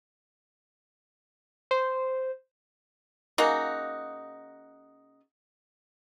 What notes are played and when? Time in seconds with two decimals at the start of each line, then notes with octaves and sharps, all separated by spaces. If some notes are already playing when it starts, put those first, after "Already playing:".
1.71 C5
3.38 C#3 A#3 D#4 F#4